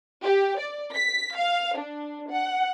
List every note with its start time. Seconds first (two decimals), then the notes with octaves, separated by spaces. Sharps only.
0.23 G4
0.59 D5
0.94 B6
1.35 F5
1.78 D4
2.30 F#5